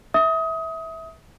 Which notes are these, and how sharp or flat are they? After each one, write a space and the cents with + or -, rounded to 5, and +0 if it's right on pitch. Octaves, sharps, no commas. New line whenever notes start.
E5 -20 D#6 +25